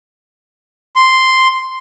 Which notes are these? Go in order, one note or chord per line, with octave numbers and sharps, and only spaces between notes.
C6